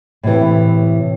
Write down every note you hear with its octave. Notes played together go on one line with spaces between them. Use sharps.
A2 C3 E3